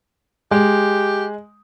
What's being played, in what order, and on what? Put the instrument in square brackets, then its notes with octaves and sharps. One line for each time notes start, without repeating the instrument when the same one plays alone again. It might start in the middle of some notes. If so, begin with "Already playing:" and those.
[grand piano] G#3 [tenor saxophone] G4